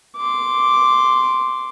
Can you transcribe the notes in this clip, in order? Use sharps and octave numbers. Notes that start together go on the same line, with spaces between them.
C6 D6